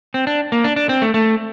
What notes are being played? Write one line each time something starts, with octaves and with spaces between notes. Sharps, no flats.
C4
D4
A#3
D4
D4
C4
A3
A3